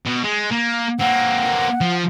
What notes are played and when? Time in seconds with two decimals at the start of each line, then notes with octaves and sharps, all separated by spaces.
0.05 B2
0.23 G#3
0.51 A#3
0.99 A#3 C4 F#5
1.81 F3